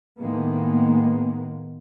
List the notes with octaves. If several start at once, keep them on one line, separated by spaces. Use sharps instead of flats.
D#2 A2 D#3 G#3 A#3 B3